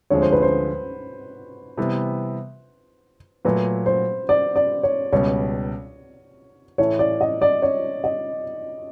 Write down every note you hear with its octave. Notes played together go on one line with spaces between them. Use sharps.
D2 D3 F3 G#3 C4 C#5
C5
B4
C5
C3 E3 G3 B3
A#2 F#3 A3 B4
C5
D5
D5
C#5
C#2 B2 G3 B3 C#5
A2 E3 A3 C#5
D5
D#5
D5
C#5
D#5